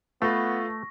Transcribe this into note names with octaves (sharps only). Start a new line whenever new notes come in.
A3 B3 F4 A4 B4 C#6 A#6